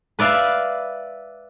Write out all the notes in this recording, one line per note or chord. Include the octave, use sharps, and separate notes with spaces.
B4 D5 E5 F5